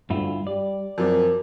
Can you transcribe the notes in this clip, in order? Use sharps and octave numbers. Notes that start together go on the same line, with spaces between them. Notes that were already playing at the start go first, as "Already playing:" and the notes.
D2 G2 E4 F4
G3 D5
F#2 F3 C4 A#4 D6